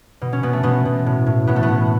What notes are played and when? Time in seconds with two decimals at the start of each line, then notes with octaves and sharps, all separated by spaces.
0.21 B2
0.33 C#4
0.43 B2 B3
0.53 A3
0.63 B2 B3
0.85 B2
1.06 A2
1.26 A2
1.47 A2 B3
1.56 A3
1.63 B3
1.68 A2